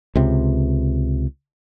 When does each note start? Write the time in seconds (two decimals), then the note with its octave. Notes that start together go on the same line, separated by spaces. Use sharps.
0.15 C#2 C3